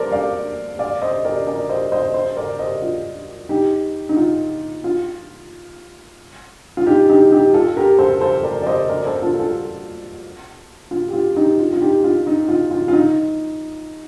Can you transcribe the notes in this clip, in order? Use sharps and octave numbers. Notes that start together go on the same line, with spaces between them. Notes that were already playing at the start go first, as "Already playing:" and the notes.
Already playing: A4 A#4 C5 D5
D5 F5
D5 F5
C5 D#5
A#4 D5
A#4 D5
C5 D#5
C5 D#5
A4 C5
A#4 D5
C5 D#5
F4
D#4 G4
D#4
F4
F4
F4
D#4 G4
D#4 G4
D#4 G4
F4 A4
G4 A#4
A4 C5
A4 C5
A#4 D5
D5
C5 D#5
A#4 D5
A4 C5
F4 A4
F4 A4
F4
G4
F4
D#4 G4
F4
F4
D#4 G4
F4
D#4
F4
F4
F4
D#4